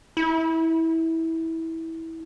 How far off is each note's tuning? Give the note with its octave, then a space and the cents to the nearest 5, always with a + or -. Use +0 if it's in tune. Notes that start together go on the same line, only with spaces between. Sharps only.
E4 -20